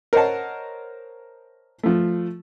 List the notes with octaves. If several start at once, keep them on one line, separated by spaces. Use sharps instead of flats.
A#4 C5 C#5 D#5 F#5 A5
F3 A3